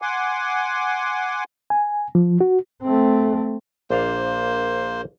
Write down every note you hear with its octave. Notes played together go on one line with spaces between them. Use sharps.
F#5 G#5 C6 D6
G#5
F3
F#4
A3 C4
A#1 A#3 D4 C5 F5